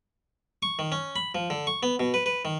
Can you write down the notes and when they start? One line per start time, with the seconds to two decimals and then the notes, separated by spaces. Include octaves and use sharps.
0.63 C#6
0.79 D#3
0.92 C#4
1.16 B5
1.35 F3
1.50 D3
1.67 C#6
1.83 B3
2.00 B2
2.14 B4
2.26 B4
2.45 D#3